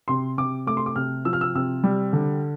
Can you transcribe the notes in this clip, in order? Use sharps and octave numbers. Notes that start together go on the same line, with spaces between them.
C3 C6
C3 D6
A3 D6
C6
D6
C3 F6
F3 E6
F6
E6
C3 E6
G3
D3